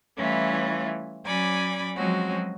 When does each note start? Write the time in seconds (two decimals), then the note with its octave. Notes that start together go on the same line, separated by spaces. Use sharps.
0.16 E3 G3 A3 C#4 E4 F4
1.25 F#3 C#4 D5 G#5 B5 D6
1.96 F3 F#3 G#3 C4 C#4 F#4